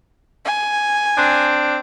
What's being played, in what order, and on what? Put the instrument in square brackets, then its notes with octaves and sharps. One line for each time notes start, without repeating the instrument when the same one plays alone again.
[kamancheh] G#5
[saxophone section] C4 D4